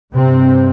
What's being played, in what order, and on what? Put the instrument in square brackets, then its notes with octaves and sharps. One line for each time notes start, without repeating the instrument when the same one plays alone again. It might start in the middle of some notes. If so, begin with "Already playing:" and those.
[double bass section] G2 C3 C4